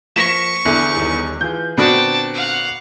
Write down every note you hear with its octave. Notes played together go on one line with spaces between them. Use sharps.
F3 A#3 C#6 A#6 B6 E7
E2 D3 E5
D#1 D#2
E3 F4 G#4 G6
A#2 D3 B3 C4 D4 F#4 G5 A5
F5 F#5